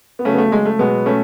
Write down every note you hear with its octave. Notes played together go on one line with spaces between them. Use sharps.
B3
C#3 F#3 A3 C#4
B3
A3
G#3
A3
B2 F#3 G#3 B3
A3 C#4